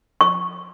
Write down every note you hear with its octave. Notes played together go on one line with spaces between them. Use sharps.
C#6